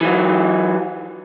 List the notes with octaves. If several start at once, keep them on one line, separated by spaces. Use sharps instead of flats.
E3 F#3